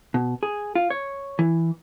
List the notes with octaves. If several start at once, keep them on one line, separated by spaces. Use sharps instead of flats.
B2
G#4
F4
C#5
E3